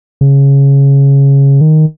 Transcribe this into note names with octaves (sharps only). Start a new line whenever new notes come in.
C#3
D#3